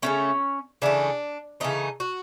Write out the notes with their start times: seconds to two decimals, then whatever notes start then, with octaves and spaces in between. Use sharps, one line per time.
0.02 C#3 E3 A3 C#4
0.82 C#3 E3 A3 D4
1.60 C#3 E3 A3 D#4
2.00 F#4